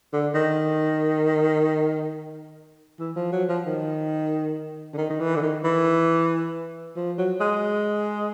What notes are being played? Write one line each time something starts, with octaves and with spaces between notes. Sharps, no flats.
D3
D#3
E3
F3
F#3
F3
D#3
D3
D#3
D#3
E3
D3
D#3
E3
F3
F#3
G#3